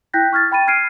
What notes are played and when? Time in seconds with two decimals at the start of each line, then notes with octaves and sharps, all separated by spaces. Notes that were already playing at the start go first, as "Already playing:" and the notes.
0.14 E4 G5 F#6 G6 A#6 B6
0.33 C#6 F6 G#6 A6
0.52 G5 B5 A6 D#7
0.67 F6 G#6 C7 D7 D#7